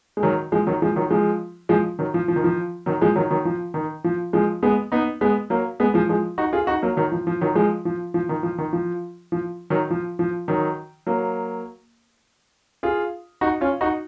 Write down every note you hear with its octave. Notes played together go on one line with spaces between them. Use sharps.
G#3
D#3 F#3
F3 G#3
D#3 F#3
F3 G#3
D#3 F#3
F3 G#3
F3 G#3
D#3 F#3
F3
F3
D#3
F3
D#3 F#3
F3 G#3
D#3 F#3
D#3 F#3
F3
D#3
F3
F3 G#3
G#3 B3
B3 D#4
G#3 B3
F#3 A#3
G#3 B3
F3 G#3
F3 G#3
D#4 F#4
F4 G#4
D#4 F#4
F#3 A#3
D#3 F#3
F3
F3
D#3 F#3
F3 G#3
F3
F3
D#3
F3
D#3
F3
F3
D#3 F#3
F3
F3
D#3 F#3
F#3 A#3
F4 G#4
D#4 F#4
C#4 F4
D#4 F#4